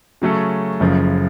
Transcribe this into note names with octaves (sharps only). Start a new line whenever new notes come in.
C#3 F#3 A3 C#4 A4
F#1 F#2 C#3 F3